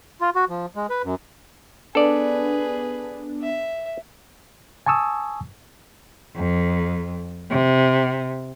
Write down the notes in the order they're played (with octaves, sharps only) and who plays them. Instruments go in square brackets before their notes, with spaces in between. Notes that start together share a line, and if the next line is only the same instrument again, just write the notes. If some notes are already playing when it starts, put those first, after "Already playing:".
[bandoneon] F4
F#4
F3
G#3
B4
F#2
[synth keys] B3 D4 [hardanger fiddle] G#4 B4 [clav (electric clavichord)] A4 D5
[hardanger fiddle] E5
[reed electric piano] G#5 A5 C#6 D#6 E6
[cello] F2
C3